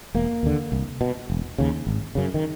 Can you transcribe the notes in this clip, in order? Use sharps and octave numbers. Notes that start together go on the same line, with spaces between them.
E1 A#3
D#2 D3
C2
B2
E1
D#2 C#3
G#1
F#2 C#3
D#3